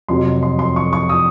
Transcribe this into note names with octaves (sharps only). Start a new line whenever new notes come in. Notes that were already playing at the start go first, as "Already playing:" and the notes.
F1 F2 C3 F#3 C6
C6
C6
C#6
C#6
D#6